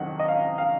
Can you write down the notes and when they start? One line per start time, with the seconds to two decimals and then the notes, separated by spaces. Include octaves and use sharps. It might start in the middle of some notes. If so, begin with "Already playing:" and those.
Already playing: F2 D#3 F#3 F#5
0.19 D#5
0.28 F5
0.58 F5